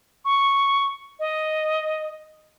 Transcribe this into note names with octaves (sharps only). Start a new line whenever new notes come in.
C#6
D#5